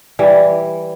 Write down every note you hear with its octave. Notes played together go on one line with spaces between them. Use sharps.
E3 G3